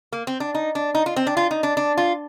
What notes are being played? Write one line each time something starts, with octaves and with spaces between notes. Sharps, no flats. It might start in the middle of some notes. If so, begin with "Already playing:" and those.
A#3
C4
D4
D#4
D4
D#4
F4
C4
D4
F4
D#4
D4
D4
F4